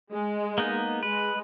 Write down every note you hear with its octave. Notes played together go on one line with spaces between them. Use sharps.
G#3
A#3 B3 D#4
G#3 B4